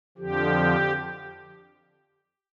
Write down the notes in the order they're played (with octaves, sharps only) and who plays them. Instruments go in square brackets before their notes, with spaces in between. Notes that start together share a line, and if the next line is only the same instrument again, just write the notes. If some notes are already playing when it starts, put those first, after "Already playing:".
[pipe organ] F2 D3 F3 G4